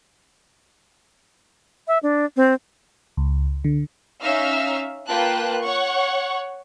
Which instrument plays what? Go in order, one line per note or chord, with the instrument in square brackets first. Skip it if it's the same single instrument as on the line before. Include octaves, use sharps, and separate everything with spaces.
[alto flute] E5
D4
C4
[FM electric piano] C#2
D3
[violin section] C#4 D#4 E5 F5 E6 F6
A#3 F4 B4 G5 A5 F#6
C#5 F#5 C#6